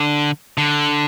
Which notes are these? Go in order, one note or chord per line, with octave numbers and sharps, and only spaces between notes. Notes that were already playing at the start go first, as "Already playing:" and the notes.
Already playing: D3
D3